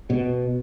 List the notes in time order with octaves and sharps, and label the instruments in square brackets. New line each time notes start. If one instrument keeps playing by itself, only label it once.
[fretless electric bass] B2